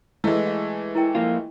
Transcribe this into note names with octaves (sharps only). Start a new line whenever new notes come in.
E3 G#3 A3 E4 F5 E6
F5
E4 A#4 G5
F3 A#3 F4